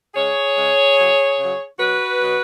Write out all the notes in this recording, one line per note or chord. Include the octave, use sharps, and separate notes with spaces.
C#3 G#3 G#4 C#5
C#3 G#3
C#3 F#3
C#3 F#3
B2 F#3 F#4 B4
B2 F#3